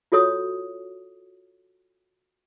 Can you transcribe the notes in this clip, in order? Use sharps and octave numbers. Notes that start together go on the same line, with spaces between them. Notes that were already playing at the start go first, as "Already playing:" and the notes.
F4 F#4 A4 C#5 D#6